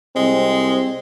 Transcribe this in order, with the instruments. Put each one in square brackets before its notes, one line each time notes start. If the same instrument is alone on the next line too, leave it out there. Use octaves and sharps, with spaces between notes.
[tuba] C2 [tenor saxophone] G#3 [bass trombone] C4